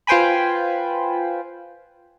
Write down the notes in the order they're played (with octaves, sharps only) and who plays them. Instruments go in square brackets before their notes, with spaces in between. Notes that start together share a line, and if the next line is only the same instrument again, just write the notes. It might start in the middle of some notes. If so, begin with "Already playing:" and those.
[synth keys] F4 B4 C5 G5 G#5 B5